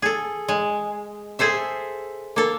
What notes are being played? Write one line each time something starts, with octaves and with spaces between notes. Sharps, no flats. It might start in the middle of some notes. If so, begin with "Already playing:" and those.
G#4 A4
G#3
G#4 A4 C5 E5
A#3 A4